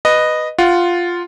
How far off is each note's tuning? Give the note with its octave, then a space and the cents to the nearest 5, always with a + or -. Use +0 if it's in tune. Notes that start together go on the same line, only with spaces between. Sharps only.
B4 +0 D#5 -10
F4 +0 F#5 +10